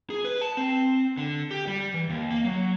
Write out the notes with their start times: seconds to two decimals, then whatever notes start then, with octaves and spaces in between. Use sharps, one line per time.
0.10 G#4
0.25 B4
0.42 A5
0.57 C4
1.17 D3
1.51 G4
1.67 G3
1.94 E3
2.10 D#2
2.31 A#3
2.45 F#3